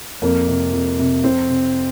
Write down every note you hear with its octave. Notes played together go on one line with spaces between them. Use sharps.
F2 A#3
C3
F2
C3
F2 C4
C3